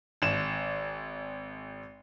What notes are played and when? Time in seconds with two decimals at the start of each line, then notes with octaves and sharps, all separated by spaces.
0.22 G#1 E7